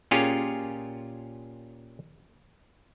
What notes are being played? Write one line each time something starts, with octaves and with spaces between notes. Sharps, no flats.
A#2 C#4 F4 G4 G#4 C#5